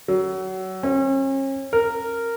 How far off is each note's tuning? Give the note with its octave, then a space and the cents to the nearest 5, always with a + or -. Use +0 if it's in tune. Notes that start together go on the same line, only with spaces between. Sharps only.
F#3 +25
C#4 -40
A#4 -10